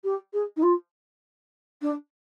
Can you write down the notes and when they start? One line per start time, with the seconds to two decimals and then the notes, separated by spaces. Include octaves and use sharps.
0.04 G4
0.33 G#4
0.56 D#4
0.62 F4
1.81 D4